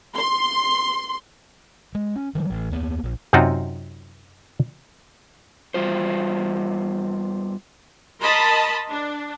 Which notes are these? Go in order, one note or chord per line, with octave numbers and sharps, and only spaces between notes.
C6
G#3
C#4
D#3 F#3 G3
A1
D#2 A#3 B3
A#1
F#2 C3 C4 D#4 F4 F#4
E2 G3 F4 C5
A#4 D#5 A5 B5 C6
D4